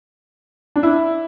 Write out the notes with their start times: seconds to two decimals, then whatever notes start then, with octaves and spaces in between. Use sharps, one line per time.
0.76 D4
0.83 E4